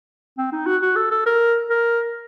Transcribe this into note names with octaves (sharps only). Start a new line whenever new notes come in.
C4
D#4
F#4
F#4
A4
A4
A#4
A#4